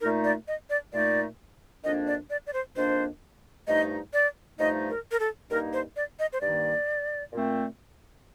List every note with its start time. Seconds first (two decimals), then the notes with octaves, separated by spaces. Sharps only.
0.01 A#2 A3 D#4 A#4
0.24 D5
0.48 D#5
0.70 D5
0.93 A#2 A3 D#4 D5
1.84 F2 D#3 A#3 D4 D#5
2.07 D5
2.30 D5
2.47 D5
2.53 C5
2.76 F2 D#3 A#3 D4 C5
3.67 G2 F3 A3 D#4 D#5
4.13 D5
4.59 G2 F3 A3 D#4 D#5
4.90 A#4
5.11 A#4
5.19 A4
5.50 G2 D#3 A#3 D#4 A#4
5.73 C5
5.96 D5
6.19 D#5
6.33 C5
6.41 G2 D#3 A#3 D#4 D5
7.33 A#2 A3 C4